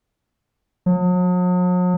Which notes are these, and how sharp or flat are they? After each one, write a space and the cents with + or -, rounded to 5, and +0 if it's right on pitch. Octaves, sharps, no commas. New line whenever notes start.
F#3 -45